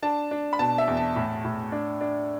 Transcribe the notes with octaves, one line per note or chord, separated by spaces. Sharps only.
D4 A5
D4
B5
B2 A5
E5
E2
A5
A2
A2
D4
D4